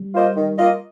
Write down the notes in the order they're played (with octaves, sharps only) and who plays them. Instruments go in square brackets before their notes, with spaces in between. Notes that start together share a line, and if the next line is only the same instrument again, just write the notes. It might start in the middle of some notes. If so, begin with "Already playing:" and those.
Already playing: [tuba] G3
[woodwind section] A#3 F4 C5 D#5
D#3
A#3 F4 D#5